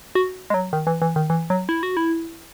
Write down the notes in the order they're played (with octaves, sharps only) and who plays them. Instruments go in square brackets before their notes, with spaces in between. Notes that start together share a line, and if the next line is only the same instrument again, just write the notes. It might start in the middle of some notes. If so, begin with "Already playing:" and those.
[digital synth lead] F#4
G#3
F#3
D#3
E3
E3
D#3
E3
F#3
E4
F#4
E4